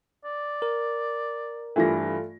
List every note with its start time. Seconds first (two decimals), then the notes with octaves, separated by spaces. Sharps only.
0.25 D5
0.62 A#4
1.76 G2 E3 A3 F4 A#6